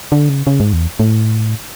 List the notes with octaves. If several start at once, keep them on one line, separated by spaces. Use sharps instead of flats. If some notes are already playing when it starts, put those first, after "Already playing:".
D3
C#3
C#3
G#2
E2
A2